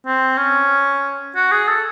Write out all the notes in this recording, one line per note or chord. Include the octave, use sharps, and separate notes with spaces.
C4
C#4
F#4
G#4
A4